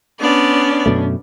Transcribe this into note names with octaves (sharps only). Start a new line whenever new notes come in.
B3 C#4 D4 D5
F#2 B2 A3